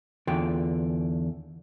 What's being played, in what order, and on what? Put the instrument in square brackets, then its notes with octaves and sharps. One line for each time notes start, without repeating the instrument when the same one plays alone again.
[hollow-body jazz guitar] E2 D3 F4 G5